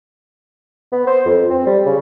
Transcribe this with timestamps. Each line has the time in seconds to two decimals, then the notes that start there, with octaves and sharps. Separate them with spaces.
0.92 B3
1.07 C5
1.25 F2
1.50 C4
1.66 G3
1.86 C#3